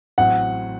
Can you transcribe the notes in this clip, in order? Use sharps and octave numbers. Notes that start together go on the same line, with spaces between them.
A1 A2 F#3 C4 F#5